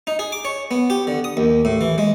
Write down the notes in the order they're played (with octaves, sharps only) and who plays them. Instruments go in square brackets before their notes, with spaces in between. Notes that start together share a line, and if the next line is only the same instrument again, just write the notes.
[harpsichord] D#4
G#4
D6
C#5
B3
G4
D3
D#6
D#2
A2
E3
G#3